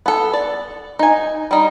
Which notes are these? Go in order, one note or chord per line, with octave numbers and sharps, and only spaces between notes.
B3 A4
D5
D#4 G#5
G3 D#4